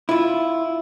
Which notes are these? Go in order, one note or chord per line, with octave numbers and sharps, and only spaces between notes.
E4 F4